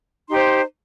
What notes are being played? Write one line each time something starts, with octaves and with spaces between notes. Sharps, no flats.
D#4 G4 C5 C6